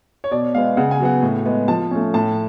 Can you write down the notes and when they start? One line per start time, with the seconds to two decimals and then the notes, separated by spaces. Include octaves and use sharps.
0.24 C#5
0.31 B2 D5
0.55 G#3 B3 F5
0.77 C#3 F#5
0.91 G#5
1.00 F#3 B3 F#5
1.23 A2
1.46 G#3 B3
1.68 F3 A5
1.91 A3 C#4
2.14 A2 A5